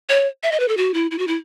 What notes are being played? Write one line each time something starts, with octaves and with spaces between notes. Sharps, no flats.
C#5
E5
D#5
B4
A4
F#4
E4
E4
F#4
E4